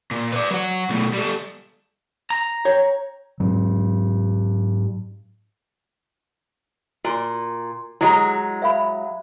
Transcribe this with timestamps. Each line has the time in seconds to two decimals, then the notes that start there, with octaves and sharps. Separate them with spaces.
0.11 A#2
0.33 B4 D5
0.51 F#3 F#5
0.89 B2 A3
1.13 G3 A4
2.30 A#5
2.65 C#5 G5
3.40 G#2 F#3
7.05 A#2 F#4
8.01 F#3 G#3 E4 G4 A#5
8.62 E5 F5 B5